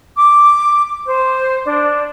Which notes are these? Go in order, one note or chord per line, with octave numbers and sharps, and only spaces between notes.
D6
C5
D4